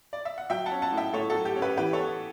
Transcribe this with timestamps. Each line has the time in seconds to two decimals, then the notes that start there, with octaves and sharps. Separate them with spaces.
0.13 D5
0.25 E5
0.38 F#5
0.50 F#3 E5 G5
0.66 F#5 A5
0.71 C#4
0.82 F#5 A5
0.92 A2
0.97 E5 G5
1.13 A2 A4 C#5
1.30 F#4 A4
1.35 F#3
1.45 G4
1.56 C#4
1.62 G4 B4
1.77 E3 G4 B4
1.93 A4 C#5
1.99 B3